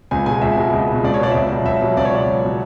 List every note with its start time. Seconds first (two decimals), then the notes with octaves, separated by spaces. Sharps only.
0.11 C#2 G#5
0.26 B2 G#3 G#5
0.42 C#2 E5
0.57 B2 G#3
0.73 C#2
0.88 B2 G#3
1.03 C#2 D5
1.14 C#5
1.19 B2 G#3 D5
1.31 E5
1.34 C#2 D5
1.51 B2 F#3
1.65 C#2 E5
1.81 B2 F#3
1.97 C#2 D5
2.05 C#5
2.12 B2 F#3 D5
2.27 C#2
2.43 B2 F#3